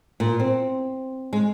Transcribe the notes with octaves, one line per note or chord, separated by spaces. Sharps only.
A#2
C4
G#3